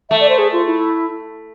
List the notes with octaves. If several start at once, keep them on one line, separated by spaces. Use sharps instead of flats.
A3 E5
D5
C5
G#4
F4
E4